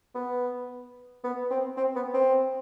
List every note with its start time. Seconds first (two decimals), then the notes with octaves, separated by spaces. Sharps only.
0.15 B3
1.24 B3
1.51 C4
1.77 C4
1.96 B3
2.14 C4